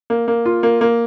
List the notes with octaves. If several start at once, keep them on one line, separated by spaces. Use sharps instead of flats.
A#3
A#3
F4
A#3
A#3